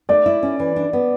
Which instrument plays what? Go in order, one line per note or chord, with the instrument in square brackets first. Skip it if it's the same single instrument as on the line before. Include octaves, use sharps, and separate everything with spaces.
[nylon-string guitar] A3 [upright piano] D5
[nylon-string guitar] E4
C#4
E3
D4
B3